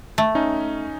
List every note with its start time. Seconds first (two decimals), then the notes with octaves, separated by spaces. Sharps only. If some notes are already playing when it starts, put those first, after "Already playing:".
0.18 A3
0.35 C#4 D#4